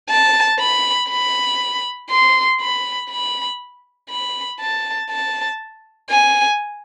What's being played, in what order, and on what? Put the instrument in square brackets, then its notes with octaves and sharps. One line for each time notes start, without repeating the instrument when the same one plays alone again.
[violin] A5
B5
B5
C6
B5
B5
B5
A5
A5
G#5